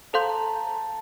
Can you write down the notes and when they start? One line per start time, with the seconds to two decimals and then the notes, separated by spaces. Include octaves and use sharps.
0.13 A4 C5 F5 A5 C6 G6
0.21 A#5
0.29 A5
0.41 A#5
0.67 A5